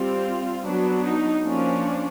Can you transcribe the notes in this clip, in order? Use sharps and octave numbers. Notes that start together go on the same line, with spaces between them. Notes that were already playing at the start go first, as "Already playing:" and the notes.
Already playing: G3 C4 F4
F#3 B3 D4
D#4
F3 A#3 C#4 D4